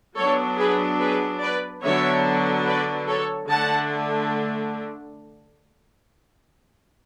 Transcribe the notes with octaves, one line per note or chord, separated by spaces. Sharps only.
F#3 B3 D4 A4 C#5
G#4 B4
G#4 B4
B4 D5
D3 F#3 B3 D4 C#5 E5
B4 D5
A4 C#5
D3 A3 D4 F#5 A5